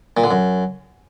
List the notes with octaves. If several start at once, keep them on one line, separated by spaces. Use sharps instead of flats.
A#2
D3
F#2